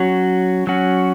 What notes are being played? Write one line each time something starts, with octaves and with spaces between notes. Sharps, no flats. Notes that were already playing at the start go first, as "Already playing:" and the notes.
Already playing: F#3 C#4 F#4
F#3 C#4 F#4